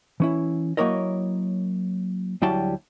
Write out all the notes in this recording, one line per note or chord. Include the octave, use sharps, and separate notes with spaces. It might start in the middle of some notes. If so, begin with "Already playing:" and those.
E3 C#4 E4
F#3 A#3 E4 A#4 C#5 D#5
D2 F#3 G3 E4 G5 A5